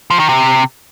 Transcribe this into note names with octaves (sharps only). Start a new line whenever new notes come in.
F3
D#3
C3